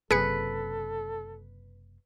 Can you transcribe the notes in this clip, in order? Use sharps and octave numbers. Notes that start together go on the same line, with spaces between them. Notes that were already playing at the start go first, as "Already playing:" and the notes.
F#1 C3 F#3 G#4 A4 B4 C#7